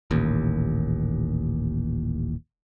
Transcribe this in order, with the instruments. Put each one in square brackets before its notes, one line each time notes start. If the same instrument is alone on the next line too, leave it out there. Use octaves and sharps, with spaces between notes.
[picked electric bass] D#1 A1 D#2